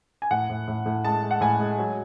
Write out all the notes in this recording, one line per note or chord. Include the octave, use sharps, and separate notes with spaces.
G#5
A2 F#5
A2
A2
A2
G#3 A5
G#3
F#5
A2 G#5
G#3
F#3